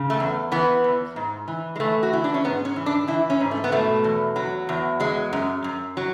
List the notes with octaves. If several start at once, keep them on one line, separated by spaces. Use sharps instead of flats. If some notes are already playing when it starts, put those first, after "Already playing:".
Already playing: C#3
A3
E2
E3 B3
E2
G#2
E3
G#3
E3 A3
F#4
E3 E4
D4
C#4
G#2 B3
C#4
E3
D4
E3 E4
C#4
G#2
A3
B3
B2 A3
E2
F#3
E2
F#3 G#3
F#2
F#2
F#3